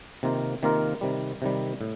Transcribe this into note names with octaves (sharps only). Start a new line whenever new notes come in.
C3 D#3 A#3 F4 A#4
C3 D#3 A#3 F4 A#4
C3 D#3 G3
C3 D#3 G3
A2